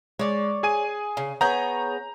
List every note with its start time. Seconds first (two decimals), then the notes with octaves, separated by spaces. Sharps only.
0.19 G#3 C#5 D5
0.63 G#4 G#5 D#7
1.17 C#3
1.41 B3 G#4 C#5 A#5 G6